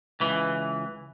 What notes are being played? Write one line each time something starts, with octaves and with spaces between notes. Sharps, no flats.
C#2 E3